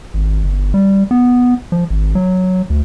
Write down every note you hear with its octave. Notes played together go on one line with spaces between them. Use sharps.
G#1
G1
G3
B3
F3
G#1
F#3
D2